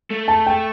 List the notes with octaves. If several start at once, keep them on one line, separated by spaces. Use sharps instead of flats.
A3
A5
G5